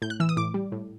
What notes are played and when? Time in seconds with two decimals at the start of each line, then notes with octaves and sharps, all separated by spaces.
0.02 A2 G6
0.10 F#6
0.20 E3 E6
0.29 D#6
0.37 A2 D6
0.54 G3
0.72 A2